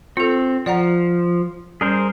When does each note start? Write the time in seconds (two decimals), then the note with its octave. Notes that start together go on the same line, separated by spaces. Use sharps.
0.17 C4 F4 A4
0.66 F3 D5 F#5 A#5
1.81 G3 C#4 G#4 A#4 C5